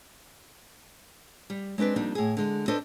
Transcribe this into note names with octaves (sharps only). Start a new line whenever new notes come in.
G3
G#3 C4 D4 B4 D5
F2 G3 A#3 D4 D#4
A2 G#4
D3 G#3
D4 A4 B4 C5 D#5